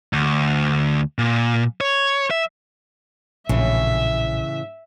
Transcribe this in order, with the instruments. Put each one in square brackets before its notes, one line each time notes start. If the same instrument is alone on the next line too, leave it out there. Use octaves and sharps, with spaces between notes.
[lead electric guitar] D2
A#2
C#5
E5
[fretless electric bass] A#1 [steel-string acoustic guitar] A2 C#3 E3 [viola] E5